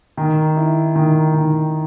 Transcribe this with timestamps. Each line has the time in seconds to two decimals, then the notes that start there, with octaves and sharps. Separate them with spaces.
0.17 D#3
0.57 E4
0.95 D#3
1.34 D#3